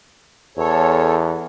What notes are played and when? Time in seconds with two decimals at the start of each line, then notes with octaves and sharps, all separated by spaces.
0.58 E2 A4 C#5